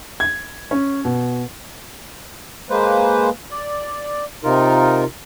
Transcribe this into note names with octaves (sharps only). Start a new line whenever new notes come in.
G#6
C#4
B2
G#3 A#3 B4 C5
D5
C3 D#4 F4 A#4